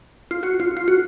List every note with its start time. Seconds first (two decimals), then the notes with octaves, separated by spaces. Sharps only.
0.31 F4
0.43 F#4
0.60 F4
0.77 F4
0.88 F#4